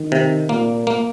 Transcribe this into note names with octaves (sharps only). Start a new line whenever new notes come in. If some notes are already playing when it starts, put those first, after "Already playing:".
Already playing: D#3
C3
A#2 A#3
A#3